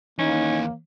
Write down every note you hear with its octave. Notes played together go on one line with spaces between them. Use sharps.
D#2 E3 A#3 C#4 D#4